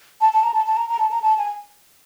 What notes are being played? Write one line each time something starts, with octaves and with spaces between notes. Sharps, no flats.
A5
A5
A#5
A5
A5
A#5
A#5
A5
A#5
A5
G#5